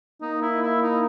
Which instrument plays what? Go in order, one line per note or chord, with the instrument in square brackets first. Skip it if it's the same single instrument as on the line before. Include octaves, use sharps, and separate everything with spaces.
[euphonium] A#3 [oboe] D#4
[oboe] E4
E4
D#4